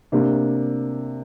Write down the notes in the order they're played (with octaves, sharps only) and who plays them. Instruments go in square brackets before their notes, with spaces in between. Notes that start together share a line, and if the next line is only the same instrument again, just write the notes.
[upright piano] C3 A#3 D4